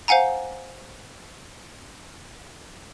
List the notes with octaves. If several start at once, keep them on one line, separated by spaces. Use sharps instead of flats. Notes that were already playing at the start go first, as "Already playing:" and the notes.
C5 F5 F#5 G#5 A#5